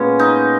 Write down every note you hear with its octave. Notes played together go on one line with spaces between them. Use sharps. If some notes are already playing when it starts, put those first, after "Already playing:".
Already playing: A#2 G#3 B3 C#4
D#4